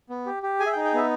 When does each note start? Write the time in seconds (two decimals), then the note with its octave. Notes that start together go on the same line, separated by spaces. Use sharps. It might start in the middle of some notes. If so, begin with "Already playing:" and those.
0.10 B3
0.26 G4
0.43 G4
0.60 G#4 G#5
0.66 E5
0.72 G5
0.77 D#4
0.84 G5
0.94 B3 E5